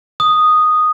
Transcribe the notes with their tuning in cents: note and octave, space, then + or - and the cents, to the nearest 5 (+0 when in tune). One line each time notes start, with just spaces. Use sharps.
D#6 -5